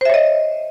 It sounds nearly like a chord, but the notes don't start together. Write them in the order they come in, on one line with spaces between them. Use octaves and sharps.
C5 E5 C#5 D#5